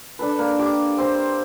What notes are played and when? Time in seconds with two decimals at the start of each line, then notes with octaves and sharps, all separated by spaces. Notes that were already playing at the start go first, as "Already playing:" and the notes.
0.19 D4 A4 B4
0.38 A#3
0.59 G4 D6
0.98 C4 C5